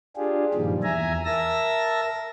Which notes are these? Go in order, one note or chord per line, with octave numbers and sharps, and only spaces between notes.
D4 F4 G4 G#4
G2 A#2 D#3 F3 G3
E2 E5 G#5 A#5
A#4 E5 A5 E6 A#6